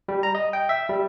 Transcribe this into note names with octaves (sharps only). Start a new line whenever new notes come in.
G3
A#5
D#5
G5
E5
G3